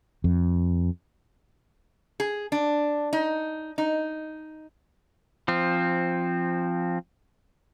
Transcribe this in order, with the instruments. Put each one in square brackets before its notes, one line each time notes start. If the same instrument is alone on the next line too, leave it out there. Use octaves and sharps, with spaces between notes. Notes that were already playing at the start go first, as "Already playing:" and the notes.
[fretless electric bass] F2
[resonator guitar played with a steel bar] G#4
D4
D#4
D#4
[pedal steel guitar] F3 C4